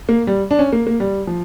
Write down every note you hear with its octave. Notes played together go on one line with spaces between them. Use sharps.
A#3
G3
D4
C#4
A#3
A#3
G3
F3